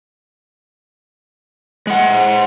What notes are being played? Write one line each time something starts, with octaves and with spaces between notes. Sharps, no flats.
G#3 F#5